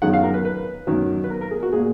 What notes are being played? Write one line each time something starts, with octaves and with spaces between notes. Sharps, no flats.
F#2 D#3 G#3 F#5
F5
A#4
B4
B4
F#2 D#3 F#3
B4
A#4
A#4
G#4
F#4
A#2 G#3 G#4